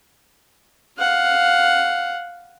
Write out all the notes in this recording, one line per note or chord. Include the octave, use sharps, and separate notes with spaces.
F5 F#5